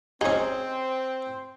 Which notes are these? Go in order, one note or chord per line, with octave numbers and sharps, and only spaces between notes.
C4 C#4 D#4 G#4 C5